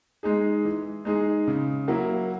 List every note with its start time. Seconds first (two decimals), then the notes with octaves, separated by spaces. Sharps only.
0.23 G#3 D#4 G#4
0.65 E3
1.05 G#3 D#4 G#4
1.47 C#3
1.88 F#3 A#3 E4